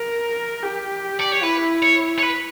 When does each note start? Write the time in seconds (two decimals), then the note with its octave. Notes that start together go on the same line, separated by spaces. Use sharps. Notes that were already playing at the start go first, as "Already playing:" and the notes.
Already playing: A#4
0.63 G4
1.20 D5
1.32 C#5
1.43 E4 B4
1.83 C#5
2.19 C#5
2.23 B4